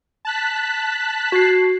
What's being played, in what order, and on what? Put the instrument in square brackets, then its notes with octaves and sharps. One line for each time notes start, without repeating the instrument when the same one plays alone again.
[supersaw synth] A5 F#6 B6
[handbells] F#4 C7